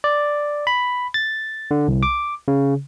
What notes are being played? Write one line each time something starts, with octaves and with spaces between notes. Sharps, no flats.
D5
B5
A6
D3
C2
D6
C#3